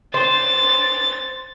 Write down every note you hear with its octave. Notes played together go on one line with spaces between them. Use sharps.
C5 A6